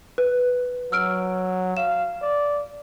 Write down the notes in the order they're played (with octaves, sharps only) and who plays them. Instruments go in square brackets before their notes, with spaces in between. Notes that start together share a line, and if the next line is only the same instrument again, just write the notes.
[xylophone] B4
[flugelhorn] F#3 [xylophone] E6 F6 D7
[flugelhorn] F5 [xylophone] E7
[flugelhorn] D5